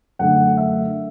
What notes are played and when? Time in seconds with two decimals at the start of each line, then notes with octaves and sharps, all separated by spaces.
0.19 F#2 D3 A3 F#5
0.58 E5